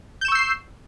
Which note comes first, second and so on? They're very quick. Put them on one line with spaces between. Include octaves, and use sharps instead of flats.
G6 E7 C#6 E6 C7